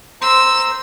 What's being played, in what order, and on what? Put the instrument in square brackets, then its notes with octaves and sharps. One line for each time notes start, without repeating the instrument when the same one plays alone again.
[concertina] C5 A#5 C6 [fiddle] E6